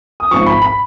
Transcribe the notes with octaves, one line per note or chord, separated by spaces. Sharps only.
D#6
G#1 G#2 F3 C#6
B5
B5